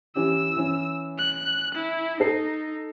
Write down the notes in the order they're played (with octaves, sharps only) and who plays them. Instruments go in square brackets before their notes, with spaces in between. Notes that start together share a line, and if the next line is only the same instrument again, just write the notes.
[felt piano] E3 C#4 G4 [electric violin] E6
[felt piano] E3 C#4
[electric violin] F#6
E4
[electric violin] D#4 [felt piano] A4 C7